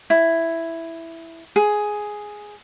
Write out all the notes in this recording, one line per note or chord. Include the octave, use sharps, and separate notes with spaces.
E4
G#4